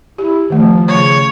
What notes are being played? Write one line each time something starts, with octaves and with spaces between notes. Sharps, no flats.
E4 G4
D#3 F3 A3
C#3 C#5